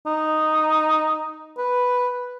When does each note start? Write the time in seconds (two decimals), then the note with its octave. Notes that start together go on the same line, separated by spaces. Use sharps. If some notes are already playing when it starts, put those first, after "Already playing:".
0.06 D#4
1.57 B4